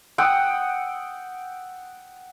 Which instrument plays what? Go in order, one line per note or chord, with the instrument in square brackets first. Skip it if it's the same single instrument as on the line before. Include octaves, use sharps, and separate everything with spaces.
[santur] F#5 G5 D#6 E6